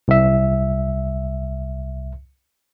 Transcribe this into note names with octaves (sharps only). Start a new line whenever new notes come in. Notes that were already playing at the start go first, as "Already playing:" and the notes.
C2 E5